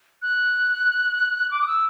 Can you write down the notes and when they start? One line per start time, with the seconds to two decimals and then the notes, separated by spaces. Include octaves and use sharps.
0.22 F#6
1.51 D6
1.62 D#6
1.67 E6